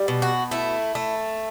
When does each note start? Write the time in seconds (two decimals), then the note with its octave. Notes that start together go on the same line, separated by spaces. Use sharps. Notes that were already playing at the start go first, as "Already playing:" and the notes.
Already playing: G3
0.08 B2
0.22 F#4
0.51 A3 E4
0.95 A3